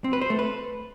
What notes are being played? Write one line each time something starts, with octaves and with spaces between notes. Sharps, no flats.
C4
B4
C5
A3
B4